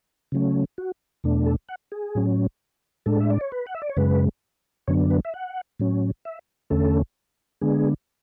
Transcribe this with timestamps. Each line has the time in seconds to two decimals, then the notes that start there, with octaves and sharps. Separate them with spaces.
0.32 C#3 F#3 A3 C#4
0.78 F#4
1.24 E2 B2 A3 D4
1.46 A4
1.69 F#5
1.92 G#4
2.15 A2 F#3 C#4
3.06 A2 G#3 D4 A4
3.20 E5
3.30 D5
3.41 C#5
3.52 B4
3.67 F#5
3.75 E5
3.82 D5
3.89 C#5
3.97 F#2 C#3 G#3 B4
4.88 F#2 D3 F#3 B3 D4 C#5
5.11 B4
5.25 E5
5.34 F#5
5.80 A2 F#3 C#4
6.25 E5
6.70 E2 D3 A3 C#4 A4
7.61 D3 G#3 B3 D4 G#4